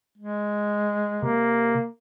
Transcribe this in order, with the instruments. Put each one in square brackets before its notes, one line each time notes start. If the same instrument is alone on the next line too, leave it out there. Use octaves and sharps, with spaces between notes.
[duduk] G#3
[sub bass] C3 [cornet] A#3